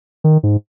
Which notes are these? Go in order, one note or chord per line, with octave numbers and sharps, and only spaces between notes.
D#3
G#2